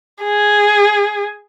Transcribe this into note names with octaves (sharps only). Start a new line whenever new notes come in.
G#4